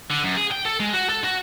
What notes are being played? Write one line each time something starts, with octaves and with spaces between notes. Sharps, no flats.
D3
F#2
G#4
G5
A4
G#3
F#4
A4
F#4